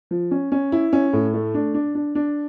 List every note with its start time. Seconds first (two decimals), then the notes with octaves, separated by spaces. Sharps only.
0.11 F3
0.31 C#4
0.52 C#4
0.72 E4
0.93 C#4
1.13 A2
1.34 A3
1.54 D4
1.74 D4
1.95 D4
2.15 D4